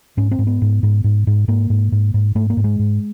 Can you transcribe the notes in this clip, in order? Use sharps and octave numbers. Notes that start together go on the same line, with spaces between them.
G#2 C#4
C4
G#2
B3
G#2
G#2
G#2
G#2
G#2 A#3
G#2
G#2
G#2
G#2 A3
A#3
G#2
G#3
G#2